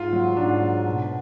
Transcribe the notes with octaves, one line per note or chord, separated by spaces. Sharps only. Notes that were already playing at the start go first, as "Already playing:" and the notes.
Already playing: G#2 F4
F#3
G#2 D4
F#3
B2